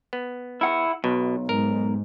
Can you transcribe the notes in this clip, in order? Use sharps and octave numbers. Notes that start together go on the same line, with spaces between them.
B3
E4 F#5
B1 B2
G#2 A#4